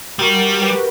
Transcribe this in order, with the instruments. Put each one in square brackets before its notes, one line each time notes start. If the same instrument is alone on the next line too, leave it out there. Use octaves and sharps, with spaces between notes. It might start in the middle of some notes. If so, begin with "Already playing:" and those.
[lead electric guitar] G3 [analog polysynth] F#4 A#4
[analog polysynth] G4 B4